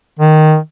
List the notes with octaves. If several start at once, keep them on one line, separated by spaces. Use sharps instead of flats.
D#3